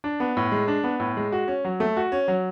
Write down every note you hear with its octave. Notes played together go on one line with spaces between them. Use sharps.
D4
B3
A2
G#3
D4
B3
A2
G#3
F#4
C#4
F#3
A3
F#4
C#4
F#3